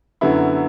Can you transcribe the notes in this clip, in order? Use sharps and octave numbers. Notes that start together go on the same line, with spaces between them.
F#2 D3 F#3 B3 E4